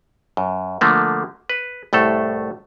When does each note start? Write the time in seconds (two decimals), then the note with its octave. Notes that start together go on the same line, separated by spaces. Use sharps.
0.37 F#2
0.81 D3 F3 A3 A#3
1.49 B4
1.93 C2 A2 A3 A4